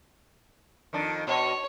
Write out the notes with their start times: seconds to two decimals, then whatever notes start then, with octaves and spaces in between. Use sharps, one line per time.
0.93 F2 D#3 D4
1.27 B2 C#5